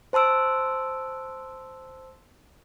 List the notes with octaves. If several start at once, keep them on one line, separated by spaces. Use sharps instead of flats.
C5 A5 C6 E6 D7